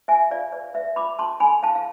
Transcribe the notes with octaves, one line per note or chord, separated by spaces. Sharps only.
F4 E5 G#5
F4 D5 F5
B4 D5
B4 E5
F4 B5 D6
F4 A5 C6
A4 G#5 B5
E4 F5 A5
F5